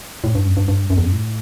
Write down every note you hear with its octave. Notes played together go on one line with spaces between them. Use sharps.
A2
G2
F#2
G2
G2
F#2
E2
F#2
A2